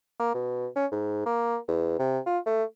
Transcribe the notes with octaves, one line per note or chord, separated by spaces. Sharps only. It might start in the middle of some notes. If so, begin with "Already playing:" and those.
A#3
B2
C#4
G#2
A#3
E2
C3
F4
A3